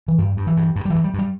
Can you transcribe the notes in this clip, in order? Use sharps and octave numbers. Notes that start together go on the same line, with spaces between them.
E3
G2 G3
G2
E3
G2
G2
G3
G2 E3
G3
G2
G3